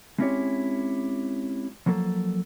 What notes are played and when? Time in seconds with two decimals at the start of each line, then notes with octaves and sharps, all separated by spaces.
0.18 G#3 C4 C#4 E4 G4 C#5
1.86 F3 F#3 A#3 A4